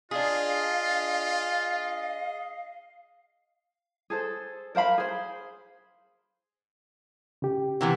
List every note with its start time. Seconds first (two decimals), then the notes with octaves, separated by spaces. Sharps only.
0.11 D4 F4 G#4 D#5 F5
4.10 G#4 A4 C5
4.75 A#4 C5 F5 B5
4.98 G#4 C5
7.42 C#3 G4
7.81 C3 E3 B3